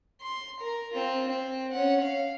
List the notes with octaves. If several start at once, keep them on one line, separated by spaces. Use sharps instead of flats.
C6
A#4
C4 F4
C4
C#4 F#5
F5